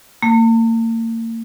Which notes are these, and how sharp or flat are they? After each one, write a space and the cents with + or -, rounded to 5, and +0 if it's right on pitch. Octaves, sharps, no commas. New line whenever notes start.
A#3 -40